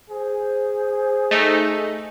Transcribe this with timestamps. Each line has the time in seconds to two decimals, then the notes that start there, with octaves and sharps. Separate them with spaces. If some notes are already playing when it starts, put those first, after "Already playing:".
0.10 G#4 C5
1.31 A3 D#4 D#5